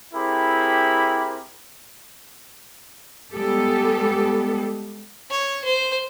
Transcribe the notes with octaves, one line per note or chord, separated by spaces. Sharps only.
C4 E4 G4 G#4 A#4 B5
G3 G#3 B3 G4 A4
C#5
C5